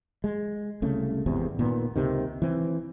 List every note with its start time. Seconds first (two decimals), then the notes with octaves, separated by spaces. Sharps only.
0.24 G#3
0.82 C2 C#3 A3
1.26 G#1 E2 C3
1.59 A#2 D#3 B3
1.96 C#2 C3 D#3
2.42 E3 C4